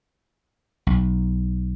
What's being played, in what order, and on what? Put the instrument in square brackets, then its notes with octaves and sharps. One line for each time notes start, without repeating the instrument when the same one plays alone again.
[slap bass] B1